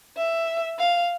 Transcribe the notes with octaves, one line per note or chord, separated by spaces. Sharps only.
E5
F5